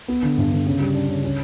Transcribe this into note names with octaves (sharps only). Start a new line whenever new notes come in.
B3
D3
G2
D3
C#3
G3
D4
C#3
C#4